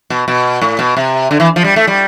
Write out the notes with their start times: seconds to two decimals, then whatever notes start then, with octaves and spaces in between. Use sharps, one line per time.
0.10 B2
0.28 B2
0.61 A2
0.79 B2
0.97 C3
1.31 D3
1.40 E3
1.56 F3
1.64 G3
1.76 A3
1.87 G3